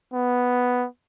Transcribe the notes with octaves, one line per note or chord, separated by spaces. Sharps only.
B3